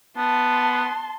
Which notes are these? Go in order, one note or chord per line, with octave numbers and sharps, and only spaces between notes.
B3 A5 C6